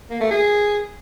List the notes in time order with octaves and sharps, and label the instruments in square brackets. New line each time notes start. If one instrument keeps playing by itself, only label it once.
[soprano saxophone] A#3
A3
G#4